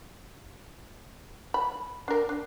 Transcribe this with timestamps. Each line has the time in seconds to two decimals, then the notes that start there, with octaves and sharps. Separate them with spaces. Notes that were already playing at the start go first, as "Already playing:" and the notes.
1.54 B5
2.08 D4 A#4
2.29 D4